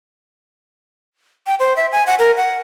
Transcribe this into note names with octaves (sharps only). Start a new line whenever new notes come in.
G5
C5
E5
G#5
F#5
A#4
F#5